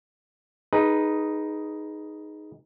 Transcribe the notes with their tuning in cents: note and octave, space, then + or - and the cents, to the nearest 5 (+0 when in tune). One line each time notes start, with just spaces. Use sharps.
D#4 +0 G#4 +0 B4 -15